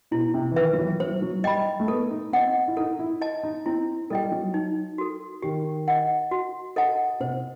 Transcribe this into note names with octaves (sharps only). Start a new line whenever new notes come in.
B2 E4
C3
E3
D#3 B4 E5
F#3
E3
F#3 C5
F#3
G3 D#5 G5 B5
A3
B3 A4
D#4
C4 D#5 F#5
E4
D#4 A4
E4
D#5 A5
D#4
C4 E4
G3 A4 D#5 G5
F#3
D#4
F#4 A4
D#3 G4
D#5 F#5
F#4
A4 D#5 F#5 A5
C3 C5